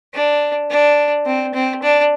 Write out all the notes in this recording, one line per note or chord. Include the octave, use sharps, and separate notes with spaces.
D4
D4
C4
C4
D4